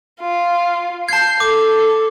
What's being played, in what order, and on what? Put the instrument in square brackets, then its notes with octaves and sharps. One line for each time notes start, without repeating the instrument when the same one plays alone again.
[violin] F4
[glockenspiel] A5 G#6 [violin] G6 C7
[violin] A4 [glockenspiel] D6